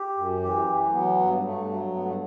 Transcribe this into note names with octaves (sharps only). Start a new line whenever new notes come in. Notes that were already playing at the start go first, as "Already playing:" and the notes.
Already playing: G4
F#2
E3 G4
E3
A3
F#3 B3
G2
G2 A3
F#3
G2 B3
A3